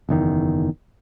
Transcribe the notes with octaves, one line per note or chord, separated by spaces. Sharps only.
F#1 E2 D#3